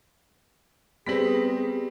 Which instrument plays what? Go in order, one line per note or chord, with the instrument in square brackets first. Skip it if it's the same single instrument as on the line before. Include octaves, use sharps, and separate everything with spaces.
[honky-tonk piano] G3 A#6 F#7 [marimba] B3 B4 [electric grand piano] C4 B6 [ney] G#4